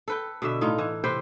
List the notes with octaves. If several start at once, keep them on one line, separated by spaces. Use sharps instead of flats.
A4 B4 G5
B2 D3 E5
A2 D#4 F4
E3
C3 B4 C5 G5